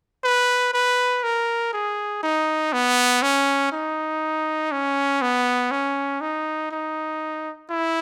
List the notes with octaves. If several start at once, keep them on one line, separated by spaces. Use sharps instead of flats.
B4
B4
A#4
G#4
D#4
B3
C#4
D#4
C#4
B3
C#4
D#4
D#4
E4